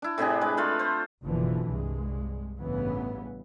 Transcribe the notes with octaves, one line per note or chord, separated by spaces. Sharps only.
D4 E4
A2 C3 D4 G#4
G#3 B4
A3 F4 F#4 B4
C5
F#1 B2 D3 E3 F3
C2 G2 G#3
A1 G2 C#3 E3 B3